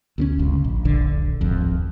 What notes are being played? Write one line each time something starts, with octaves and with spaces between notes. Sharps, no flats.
D2 A#3 C#4
D1 G1 C#2
A#1
D#1 A#1 D3
D1 G#1 F2